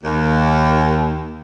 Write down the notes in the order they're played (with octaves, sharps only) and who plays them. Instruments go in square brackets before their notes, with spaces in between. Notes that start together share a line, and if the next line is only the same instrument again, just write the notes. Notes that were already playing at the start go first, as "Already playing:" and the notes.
[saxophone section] D#2